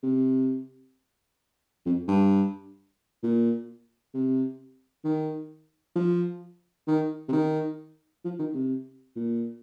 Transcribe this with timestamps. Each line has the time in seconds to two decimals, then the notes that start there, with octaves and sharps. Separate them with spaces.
0.03 C3
1.86 F2
2.08 G2
3.23 A#2
4.14 C3
5.04 D#3
5.96 F3
6.87 D#3
7.28 C3
7.32 D#3
8.24 F3
8.39 D#3
8.54 C3
9.16 A#2